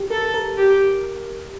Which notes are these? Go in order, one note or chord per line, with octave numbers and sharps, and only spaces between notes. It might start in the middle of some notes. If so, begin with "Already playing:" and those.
Already playing: G4
A4 A#4
A#4
G4